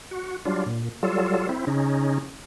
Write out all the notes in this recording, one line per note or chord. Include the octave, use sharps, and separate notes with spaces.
F#4
F#3 G3 D4 F4
A#2
F#3 G3 F4 A4
C4 E4
C#3 C#4 D#4